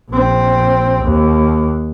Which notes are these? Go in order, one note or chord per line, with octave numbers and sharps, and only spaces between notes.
A#1 C4
D#2